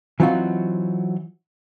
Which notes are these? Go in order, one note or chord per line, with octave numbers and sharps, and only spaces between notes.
E3 F#3 C4 D#4 F4 F#4